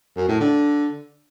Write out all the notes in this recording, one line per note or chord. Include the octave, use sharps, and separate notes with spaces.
F#2
A2
D3